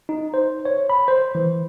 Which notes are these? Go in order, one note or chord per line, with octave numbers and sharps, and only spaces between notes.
D#4
C5
C#5
B5
C5
E3